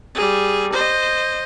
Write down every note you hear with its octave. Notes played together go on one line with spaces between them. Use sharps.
G3 G#4
C5 D#5